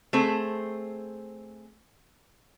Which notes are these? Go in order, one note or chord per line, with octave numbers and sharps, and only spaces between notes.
A3 C4 G#4 C5